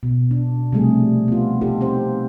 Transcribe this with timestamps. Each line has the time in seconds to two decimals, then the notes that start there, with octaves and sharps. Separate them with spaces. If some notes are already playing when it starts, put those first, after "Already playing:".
0.03 B2
0.31 D4
0.72 C3 F3 G3 A3 G#4
1.28 B3 F4
1.61 D#4 F4 G4 A4
1.81 C4 G4 C5